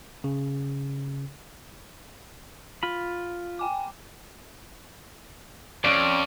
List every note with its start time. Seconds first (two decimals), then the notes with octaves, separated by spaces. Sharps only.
0.24 C#3
2.83 F4 B5
3.59 G5 G#5 D6
5.84 F2 C#4 D5